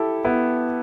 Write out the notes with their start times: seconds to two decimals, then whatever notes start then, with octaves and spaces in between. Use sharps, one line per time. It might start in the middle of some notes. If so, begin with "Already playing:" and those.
Already playing: E4 G4 A4
0.25 B3 E4